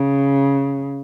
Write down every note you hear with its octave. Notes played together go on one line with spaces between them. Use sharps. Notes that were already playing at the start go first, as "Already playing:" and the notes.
Already playing: C#3